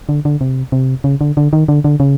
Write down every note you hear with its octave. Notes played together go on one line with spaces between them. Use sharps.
D3
D3
C3
C3
C#3
D3
D3
D#3
D3
D3
C#3